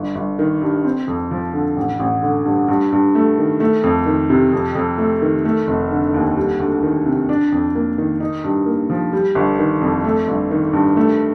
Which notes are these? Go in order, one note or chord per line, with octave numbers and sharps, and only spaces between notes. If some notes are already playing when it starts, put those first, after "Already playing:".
Already playing: G1
G1
D#3
G2
C4
F2
F3
D3
A1
A1
D3
G2
G2
G2
A3
D#3
A3
F2
D#3
C3
F2
F2
A3
D#3
A3
F1
D3
D#2
G3
D2
D#3
C3
D4
F2
A#3
D#3
D#4
G2
A#3
F3
G3
G1
D#3
F2
A3
G1
D#3
G2
A3